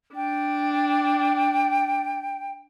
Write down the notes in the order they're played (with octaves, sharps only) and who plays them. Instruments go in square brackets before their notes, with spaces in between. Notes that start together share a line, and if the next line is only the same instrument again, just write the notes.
[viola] D4 [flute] G5